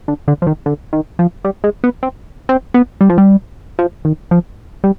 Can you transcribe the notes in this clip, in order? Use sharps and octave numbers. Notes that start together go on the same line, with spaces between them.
D3
D3
F3
D#3
D3
D#3
F3
G3
G#3
B3
C4
C4
B3
G3
F3
G3
F3
D#3
F3
G3